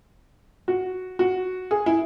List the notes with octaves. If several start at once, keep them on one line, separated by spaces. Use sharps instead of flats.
F#4
F#4
G#4
E4